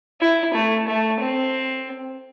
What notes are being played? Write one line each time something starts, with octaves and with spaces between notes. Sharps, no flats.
E4
A3
A3
C4